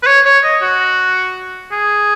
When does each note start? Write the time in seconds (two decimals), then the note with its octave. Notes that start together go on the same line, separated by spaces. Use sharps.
0.03 B4
0.07 C#5
0.26 C#5
0.44 D#5
0.62 F#4
1.72 G#4